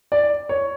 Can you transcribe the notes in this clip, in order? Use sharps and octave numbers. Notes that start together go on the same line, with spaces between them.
D5
C#5